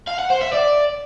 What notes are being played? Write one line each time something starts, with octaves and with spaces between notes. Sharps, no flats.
F5
F#5
C5
E5
D5